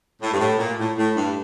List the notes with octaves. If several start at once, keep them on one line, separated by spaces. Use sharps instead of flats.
A2
G2
A2
A#2
A2
A2
G2